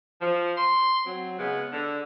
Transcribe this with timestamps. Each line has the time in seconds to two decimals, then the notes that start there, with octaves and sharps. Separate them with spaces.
0.22 F3
0.57 C6
1.07 F#3 C4
1.39 C#3 G#3 B3
1.73 D3